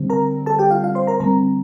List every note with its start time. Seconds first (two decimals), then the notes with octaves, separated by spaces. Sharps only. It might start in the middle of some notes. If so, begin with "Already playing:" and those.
Already playing: D3 G3 C4
0.10 A#4 A#5
0.46 A4 A5
0.59 G4 G5
0.71 F4 F5
0.84 F4 F5
0.95 C5 C6
1.07 A#4 A#5
1.20 D3 G3 C4 A#4 A#5